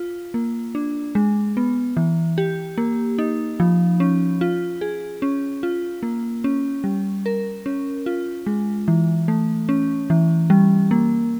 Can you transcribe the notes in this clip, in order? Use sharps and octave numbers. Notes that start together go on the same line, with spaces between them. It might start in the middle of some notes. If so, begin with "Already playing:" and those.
Already playing: F4
A#3
D4
G#3
B3
E3
G4
A#3
D#4
F3
C#4
F4
G#4
C#4
F4
A#3
C#4
G3
A#4
C#4
F4
G#3
E3
A3
C#4
E3
G3
A#3